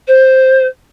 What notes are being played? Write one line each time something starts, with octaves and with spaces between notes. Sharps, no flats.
C5